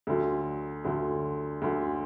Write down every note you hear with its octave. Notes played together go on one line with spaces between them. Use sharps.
D2 D3 F#3
D2 D3 F#3
D2 D3 F#3